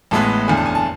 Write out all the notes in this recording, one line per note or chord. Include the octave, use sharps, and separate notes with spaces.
A1 A2 G#3 B3 A5
F#1 E2 D3 G#5
A5
G#5
A5